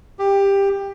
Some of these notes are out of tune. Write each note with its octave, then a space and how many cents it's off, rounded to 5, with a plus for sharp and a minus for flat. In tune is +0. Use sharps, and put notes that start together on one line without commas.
G4 +15